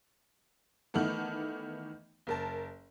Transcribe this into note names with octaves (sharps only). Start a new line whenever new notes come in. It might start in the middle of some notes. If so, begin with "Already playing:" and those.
D#3 E3 A3 B3
F#1 A#4 A5